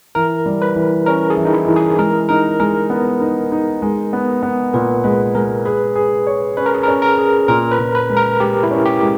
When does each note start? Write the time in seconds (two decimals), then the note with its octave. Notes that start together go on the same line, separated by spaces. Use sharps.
0.15 E3 A#4
0.46 G3
0.62 B4
0.76 E3
1.06 C#4 A#4
1.30 G#4
1.37 E3
1.45 D#4
1.53 E4
1.68 E3
1.76 G#4
1.99 G#3 A#4
2.29 D#4 A#4
2.60 G#3 A#4
2.90 B3
3.21 D#4
3.52 D#4
3.82 G#3
4.13 B3
4.43 B3
4.74 A#2 B4
5.04 G#3 B4
5.35 G#3 A#4
5.65 G#4 B4
5.95 G#4
6.27 C#5
6.57 C#4 B4
6.66 A#4
6.74 G#4
6.83 C#4 A#4
7.02 A#4
7.18 G#4
7.48 A#2 A#4
7.72 B4
7.78 A#2
7.95 B4
8.10 G#3
8.17 A#4
8.40 G#3 G4
8.63 E4
8.71 C#4
8.86 G4
9.02 G#3